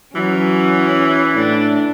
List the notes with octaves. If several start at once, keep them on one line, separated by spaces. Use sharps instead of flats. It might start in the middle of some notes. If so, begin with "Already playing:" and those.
E3 F#3 C#4
A2 D4